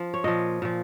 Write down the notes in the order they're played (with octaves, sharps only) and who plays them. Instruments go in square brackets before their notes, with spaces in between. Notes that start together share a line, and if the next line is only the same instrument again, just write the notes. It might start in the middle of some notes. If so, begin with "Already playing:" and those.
Already playing: [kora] F3
C#5
A#2 F3 D#5
A#2 F3